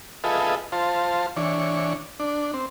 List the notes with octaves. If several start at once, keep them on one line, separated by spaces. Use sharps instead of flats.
F4 G#4 A4 B4 D#5 E5
F4 C5 A5
E3 D4 C#5
D4
C4